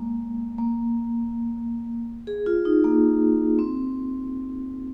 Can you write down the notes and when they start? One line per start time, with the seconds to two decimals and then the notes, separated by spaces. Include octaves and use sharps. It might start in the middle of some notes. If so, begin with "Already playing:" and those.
Already playing: G#3 A#3
0.58 A#3
2.27 G#4
2.46 F4
2.65 D#4
2.84 A#3
3.59 C4